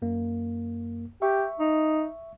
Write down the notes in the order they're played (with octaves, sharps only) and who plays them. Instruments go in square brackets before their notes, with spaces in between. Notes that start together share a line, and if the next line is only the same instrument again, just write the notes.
[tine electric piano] F#2 A#3
[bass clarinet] G4 [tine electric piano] E5 C#6
[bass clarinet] D#4